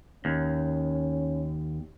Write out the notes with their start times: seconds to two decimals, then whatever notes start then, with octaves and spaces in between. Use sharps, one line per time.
0.25 D#2 C#4